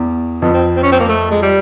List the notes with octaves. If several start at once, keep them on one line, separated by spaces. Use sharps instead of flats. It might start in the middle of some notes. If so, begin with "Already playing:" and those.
Already playing: E2
F2 B3
C4
C4
C#4
C4
A#3
A3
G#3
G3